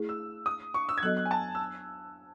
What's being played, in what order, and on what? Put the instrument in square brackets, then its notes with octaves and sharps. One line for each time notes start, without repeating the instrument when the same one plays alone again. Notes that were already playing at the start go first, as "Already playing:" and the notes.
Already playing: [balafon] A3 E4 G#4
[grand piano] E6
D#6
C#6
E6
G#6
[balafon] F#3 B3 F#4 A4 D#5 [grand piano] F#6
[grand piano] F#6
G#5
A5
E6